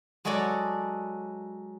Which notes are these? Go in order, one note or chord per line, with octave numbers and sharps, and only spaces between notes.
F#3 G#3 F#4 A4 C#5 D5